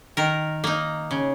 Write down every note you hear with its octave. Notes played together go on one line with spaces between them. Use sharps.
D#3 A#4
A#3 D#4
C#3